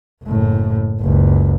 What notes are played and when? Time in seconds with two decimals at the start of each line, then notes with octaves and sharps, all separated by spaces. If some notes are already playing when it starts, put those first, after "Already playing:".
0.24 F#1 A2
1.01 F#1 C#2